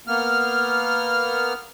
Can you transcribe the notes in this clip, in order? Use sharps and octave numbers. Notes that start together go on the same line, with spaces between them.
A#3 B3 F6